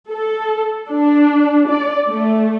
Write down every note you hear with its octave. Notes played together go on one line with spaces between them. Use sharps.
A4
D4
D5
A3